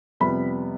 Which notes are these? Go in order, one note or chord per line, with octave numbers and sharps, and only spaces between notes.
F2 C3 G3 B3 B5